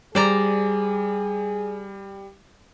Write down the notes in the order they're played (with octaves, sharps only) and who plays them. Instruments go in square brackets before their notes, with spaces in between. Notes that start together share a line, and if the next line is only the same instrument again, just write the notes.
[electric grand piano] G3 [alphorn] G#4 [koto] C5 D5 A#5